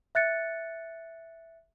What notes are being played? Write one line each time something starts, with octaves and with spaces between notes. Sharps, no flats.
E5 F#6 A6 C#7